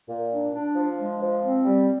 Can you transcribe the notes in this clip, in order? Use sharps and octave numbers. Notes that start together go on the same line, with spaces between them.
A#2
D4
D4
F3
G#3
F3
C4
G3